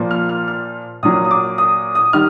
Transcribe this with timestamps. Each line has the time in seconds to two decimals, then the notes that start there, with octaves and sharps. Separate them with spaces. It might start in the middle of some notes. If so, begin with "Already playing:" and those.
Already playing: A#2 F3 A#3
0.11 F6
0.29 F6
0.48 F6
1.03 A#2 F#3 A#3 D#6
1.25 D#6
1.31 D6
1.58 D#6
1.95 D#6
2.13 D#3 G3 F6